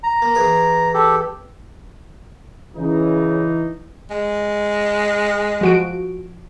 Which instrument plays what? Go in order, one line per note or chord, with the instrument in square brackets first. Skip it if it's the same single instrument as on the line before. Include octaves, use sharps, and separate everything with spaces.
[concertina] A#5
[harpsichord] A#3
E3 G#4 B4
[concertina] G4 A4
[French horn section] C#3 [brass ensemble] E3 D#4
[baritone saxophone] G#3
[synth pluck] F3 F#4 D7